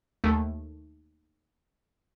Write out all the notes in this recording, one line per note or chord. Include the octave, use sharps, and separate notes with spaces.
D#2 A3